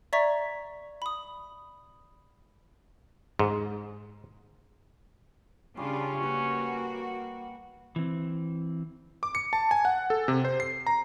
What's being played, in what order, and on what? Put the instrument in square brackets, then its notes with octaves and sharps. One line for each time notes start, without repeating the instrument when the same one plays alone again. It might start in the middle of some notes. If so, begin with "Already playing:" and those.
[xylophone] D5 E5 A#5 C#6 G#6 B6
B5 D#6
[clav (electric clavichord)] G#2
[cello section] C#3 D4 F4 [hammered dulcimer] G3 [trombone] C#4
[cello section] A#3 F#4 [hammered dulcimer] B4
[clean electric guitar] E3 C4
[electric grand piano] D6
C#7
A5
G#5
F#5
A4
C3
C5
C7
A#5